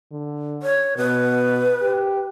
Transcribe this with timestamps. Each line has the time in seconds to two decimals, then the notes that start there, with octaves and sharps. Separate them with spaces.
0.12 D3
0.63 C#5
0.97 B2 B4
1.82 G4